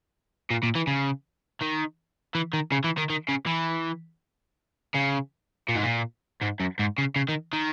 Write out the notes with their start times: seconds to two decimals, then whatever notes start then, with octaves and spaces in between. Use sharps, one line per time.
0.50 A#2
0.63 A#2
0.75 E3
0.87 C#3
1.62 D#3
2.35 E3
2.53 D#3
2.72 C#3
2.84 E3
2.97 D#3
3.10 D#3
3.28 C#3
3.46 E3
4.95 C#3
5.68 A#2
5.76 G#2
5.83 A#2
6.42 G#2
6.60 F#2
6.79 G#2
6.98 C#3
7.16 C#3
7.29 D#3
7.53 D#3